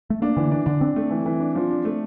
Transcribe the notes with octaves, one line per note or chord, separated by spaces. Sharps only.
A3
A#3 D4
D3 E3
D4
D3 D4
C4 D4
A3
E3
E3
D4
F3
D4
A3